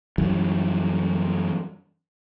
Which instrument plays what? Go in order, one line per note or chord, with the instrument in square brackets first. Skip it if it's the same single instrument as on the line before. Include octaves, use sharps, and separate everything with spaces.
[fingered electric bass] F#2 E3 G3